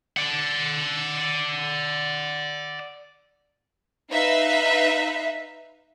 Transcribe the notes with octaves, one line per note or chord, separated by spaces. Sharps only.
D5 F#5
D#4 B4 E5 F5